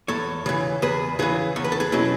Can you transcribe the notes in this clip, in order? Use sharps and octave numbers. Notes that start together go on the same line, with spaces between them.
E2 A4 C#5
C#3 E3
E2 G#4 B4
C#3 E3 G#4 B4
E2 C#5
B4
A4
G#4 B4
B2 F#3 C#4 E4